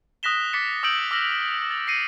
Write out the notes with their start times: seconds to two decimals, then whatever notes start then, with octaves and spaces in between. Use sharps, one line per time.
0.23 D#6 F#6 A#6 B6 E7 G7
0.53 D6 A6 B6 C#7 E7
0.83 D#6 E6 G6 D7 F#7
1.11 D6 E6 F6 A#6 F7 F#7
1.71 A6
1.87 A#6 C7 C#7 D#7